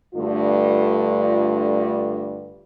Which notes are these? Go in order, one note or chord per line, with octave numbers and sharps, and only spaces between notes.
G2 D3 A3 F4